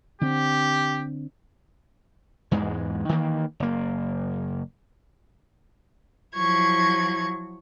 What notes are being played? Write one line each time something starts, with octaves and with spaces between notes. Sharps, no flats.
D3 C4 G4
E2 G#2 E3 G#3
D#3 E3 A3 A#3
F#1 A#3
F3 F#3 E4 C#6 G#6